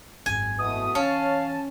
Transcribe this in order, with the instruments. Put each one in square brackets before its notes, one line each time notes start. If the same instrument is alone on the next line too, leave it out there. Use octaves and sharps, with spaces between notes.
[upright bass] G#1 F#2 [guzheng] G#5
[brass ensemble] B2 E3 A3 [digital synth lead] D#6
[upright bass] E3 [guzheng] C#4 [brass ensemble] C#5 F5 [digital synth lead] A5